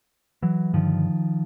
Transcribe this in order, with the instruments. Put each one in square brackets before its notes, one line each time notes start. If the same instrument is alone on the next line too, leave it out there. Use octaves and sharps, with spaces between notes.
[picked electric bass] E3 F#3
G2 D3 D#3 F3